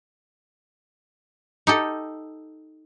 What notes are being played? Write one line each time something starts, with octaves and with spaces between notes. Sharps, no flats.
D#4 G4 A4